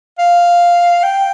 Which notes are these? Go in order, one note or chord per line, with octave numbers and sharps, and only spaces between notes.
F5
G5